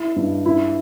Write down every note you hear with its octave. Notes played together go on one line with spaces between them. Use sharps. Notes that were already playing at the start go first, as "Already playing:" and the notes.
Already playing: E4
G2
E4